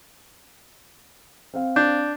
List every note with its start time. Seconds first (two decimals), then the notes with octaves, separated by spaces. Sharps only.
1.54 C4 F5
1.76 D4 G6